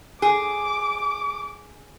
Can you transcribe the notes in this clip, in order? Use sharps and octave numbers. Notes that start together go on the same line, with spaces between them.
G#4 D6